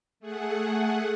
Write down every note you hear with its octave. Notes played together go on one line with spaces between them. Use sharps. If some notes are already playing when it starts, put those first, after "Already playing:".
A3 G#4 F#5